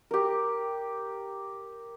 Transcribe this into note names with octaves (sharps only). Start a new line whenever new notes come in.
G4 A#4